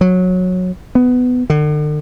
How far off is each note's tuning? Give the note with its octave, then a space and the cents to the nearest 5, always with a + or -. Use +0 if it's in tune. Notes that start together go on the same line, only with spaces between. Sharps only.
F#3 -15
B3 +15
D3 +40